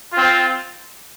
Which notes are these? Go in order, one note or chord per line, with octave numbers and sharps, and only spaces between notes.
C4 F4